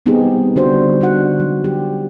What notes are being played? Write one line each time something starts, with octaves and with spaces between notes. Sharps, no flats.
G3 B3 C4 D#4 G4 G#4
D3 G3 D4 F#4 C5
D3 D4 D#4 F#4 F#5
F#3
G4